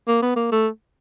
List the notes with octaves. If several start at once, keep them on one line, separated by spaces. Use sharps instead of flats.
A#3
B3
A#3
A3